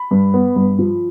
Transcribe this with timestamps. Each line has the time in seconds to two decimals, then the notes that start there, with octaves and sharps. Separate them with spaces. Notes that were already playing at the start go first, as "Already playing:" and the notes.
Already playing: B5
0.11 G2
0.34 B3
0.56 G2
0.78 F3